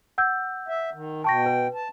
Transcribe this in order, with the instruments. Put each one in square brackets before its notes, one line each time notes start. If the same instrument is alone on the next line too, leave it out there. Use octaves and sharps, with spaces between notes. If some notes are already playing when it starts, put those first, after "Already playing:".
[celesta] F#5 E6 G6
[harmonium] E5
D#3
[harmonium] B2 G5 [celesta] A5 C#6 A#6
[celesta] B4
[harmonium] A5